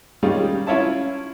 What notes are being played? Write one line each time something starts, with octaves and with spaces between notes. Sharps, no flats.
D#3 G3 G#3 C#4 D#4 F4
C#4 E4 F4 C#5 E5 A5